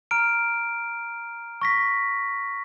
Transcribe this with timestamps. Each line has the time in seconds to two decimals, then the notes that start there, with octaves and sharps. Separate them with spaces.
0.11 A#5 F6 D7
1.62 C#6 A#6 B6